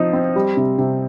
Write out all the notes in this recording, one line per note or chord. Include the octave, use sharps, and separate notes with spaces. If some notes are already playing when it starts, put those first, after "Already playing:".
Already playing: F3 C4 D#4
C4
G3
C3
C3